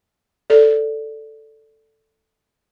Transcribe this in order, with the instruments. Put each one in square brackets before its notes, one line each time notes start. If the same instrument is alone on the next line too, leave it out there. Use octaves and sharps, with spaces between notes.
[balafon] A4 D5